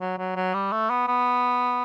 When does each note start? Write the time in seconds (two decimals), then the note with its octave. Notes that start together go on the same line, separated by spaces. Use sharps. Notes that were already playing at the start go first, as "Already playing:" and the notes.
0.01 F#3
0.18 F#3
0.36 F#3
0.54 G3
0.72 A3
0.90 B3
1.08 B3